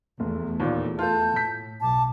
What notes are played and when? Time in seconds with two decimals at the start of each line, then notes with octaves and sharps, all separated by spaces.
0.20 F1 E2 A3
0.60 D#2 A#2 D5
0.99 F4 A4 A5 G6
1.36 A2 B6
1.80 B1 A5 D6